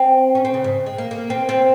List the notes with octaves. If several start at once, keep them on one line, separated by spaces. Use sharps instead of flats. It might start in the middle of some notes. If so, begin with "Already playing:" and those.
Already playing: C4
C#4
C4
C#3
G#2
G#3
A#3
A#3
C4
C4